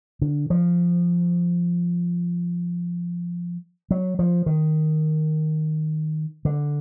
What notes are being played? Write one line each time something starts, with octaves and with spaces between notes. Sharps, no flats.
D3
F3
F#3
F3
D#3
D3